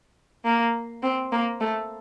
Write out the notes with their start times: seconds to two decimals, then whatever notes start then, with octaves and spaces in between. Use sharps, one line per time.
0.45 A#3
1.03 C4
1.32 A#3
1.61 A3